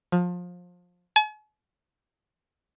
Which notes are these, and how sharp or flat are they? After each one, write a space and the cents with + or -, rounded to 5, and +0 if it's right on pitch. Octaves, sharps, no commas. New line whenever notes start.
F3 +25
G#5 +45